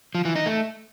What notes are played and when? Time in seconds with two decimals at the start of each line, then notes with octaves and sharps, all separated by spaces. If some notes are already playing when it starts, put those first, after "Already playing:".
0.15 F3
0.25 E3
0.35 D#4
0.46 A3